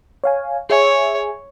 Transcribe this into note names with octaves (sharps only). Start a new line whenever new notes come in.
C#5 F5 G#5
G#4 C#5 E5 G#5